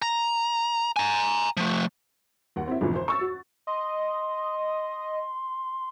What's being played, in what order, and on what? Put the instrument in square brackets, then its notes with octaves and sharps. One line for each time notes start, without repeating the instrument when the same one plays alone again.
[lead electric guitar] A#5
G#5 A#5
F3 A3
[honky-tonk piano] D#2 F#5
C4 E4
G#1 F2 B2 D3 E3 F3
C5
C#6 E6 A6
F#4
[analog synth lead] D#5 [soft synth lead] C6